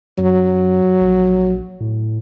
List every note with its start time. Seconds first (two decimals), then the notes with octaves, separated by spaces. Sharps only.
0.18 F#2 F#3
1.01 A#1
1.80 A2